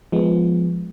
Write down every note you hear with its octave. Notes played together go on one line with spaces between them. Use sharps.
F3 G#3 B3